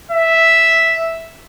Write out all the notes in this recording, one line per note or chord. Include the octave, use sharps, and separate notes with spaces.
E5